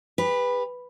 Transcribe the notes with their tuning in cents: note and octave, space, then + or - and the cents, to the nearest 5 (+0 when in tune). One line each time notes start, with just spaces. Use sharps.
G4 +45 B4 +0